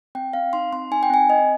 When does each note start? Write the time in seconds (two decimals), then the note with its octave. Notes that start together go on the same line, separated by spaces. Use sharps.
0.15 C4 G5
0.33 C4 F5
0.53 D#4 C6
0.72 C4 C6
0.91 D#4 G#5
1.03 G5
1.10 C4 G#5
1.30 C4 D#5